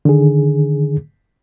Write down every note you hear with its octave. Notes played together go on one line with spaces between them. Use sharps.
D3 D#3 G#4